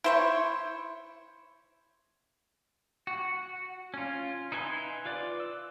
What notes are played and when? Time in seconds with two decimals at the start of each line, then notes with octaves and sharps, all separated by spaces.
0.04 E4 C5 C#5
3.07 F#4
3.94 C#4 F4
4.52 D#4 E4 B4 G#5 C6
5.05 F4 B4 D5
5.40 E6